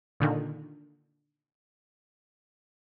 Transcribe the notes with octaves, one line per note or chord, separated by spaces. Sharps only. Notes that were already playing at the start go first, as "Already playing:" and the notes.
A#2 D3 D#3